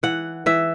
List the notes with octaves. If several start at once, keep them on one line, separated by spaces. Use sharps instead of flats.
E3 F#5
E3 E5